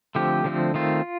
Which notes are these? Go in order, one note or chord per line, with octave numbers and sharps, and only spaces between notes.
D3 F3 A3 C4 G4
D3 F3 A3 C4
D#3 A3 C4 F4